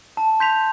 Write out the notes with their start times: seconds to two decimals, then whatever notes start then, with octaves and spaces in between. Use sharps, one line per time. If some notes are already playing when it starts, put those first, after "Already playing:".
0.17 A5
0.40 C6 G6 B6 F7